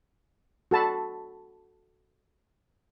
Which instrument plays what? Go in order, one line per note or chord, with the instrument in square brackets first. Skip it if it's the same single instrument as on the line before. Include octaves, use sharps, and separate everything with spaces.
[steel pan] F#4 A4 A5 B5